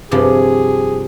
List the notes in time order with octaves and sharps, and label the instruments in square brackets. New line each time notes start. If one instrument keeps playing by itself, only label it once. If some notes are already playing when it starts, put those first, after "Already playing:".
[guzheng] G2 C3 F3 [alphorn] G#4